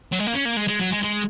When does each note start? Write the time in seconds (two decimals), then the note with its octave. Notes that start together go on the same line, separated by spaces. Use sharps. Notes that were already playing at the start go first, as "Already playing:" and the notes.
0.12 F#3
0.19 G#3
0.27 A#3
0.33 C#4
0.45 A#3
0.57 G#3
0.68 G#3
0.80 F#3
0.92 G#3
1.03 G#3